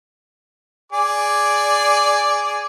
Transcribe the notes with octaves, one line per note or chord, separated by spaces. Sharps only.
G#4 D5 D6